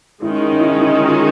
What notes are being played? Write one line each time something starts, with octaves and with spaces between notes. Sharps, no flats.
D#3 G#3 C#4 E4
D#4
E4
D#4
E4
F4